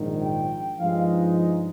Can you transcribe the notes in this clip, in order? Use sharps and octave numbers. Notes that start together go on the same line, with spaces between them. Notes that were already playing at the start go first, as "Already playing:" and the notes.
Already playing: A#1 G#2 D#3
G5
G2 F3 G#3 D#4 F5